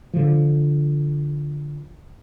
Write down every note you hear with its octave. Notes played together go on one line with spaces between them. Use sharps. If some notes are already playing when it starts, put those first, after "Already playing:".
D3 F3